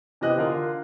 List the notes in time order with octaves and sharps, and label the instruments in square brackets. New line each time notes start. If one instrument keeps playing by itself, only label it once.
[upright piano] C3 E3 D#5 F#6
D3 F4 A#4